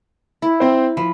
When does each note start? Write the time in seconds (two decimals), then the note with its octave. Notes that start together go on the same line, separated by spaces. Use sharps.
0.42 E4
0.60 C4 C5
0.97 F3 B5